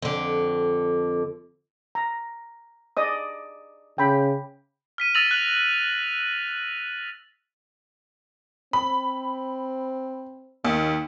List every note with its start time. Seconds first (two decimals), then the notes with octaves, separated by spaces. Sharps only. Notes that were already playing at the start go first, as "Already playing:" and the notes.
0.03 F2 D3
1.95 A#5
2.97 D5 D#5 D#6
3.98 C#3 G5 B5
4.98 F6 B6 D#7
5.15 E6 A6 A#6 D#7 F7 F#7
5.31 F#6 F#7
8.73 C4 B5
10.65 D#2 D#3